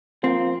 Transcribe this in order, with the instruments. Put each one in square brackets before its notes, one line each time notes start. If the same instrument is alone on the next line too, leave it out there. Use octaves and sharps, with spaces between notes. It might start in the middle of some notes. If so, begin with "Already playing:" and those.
[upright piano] F3 A#3 F4 A#4 [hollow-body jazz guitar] C4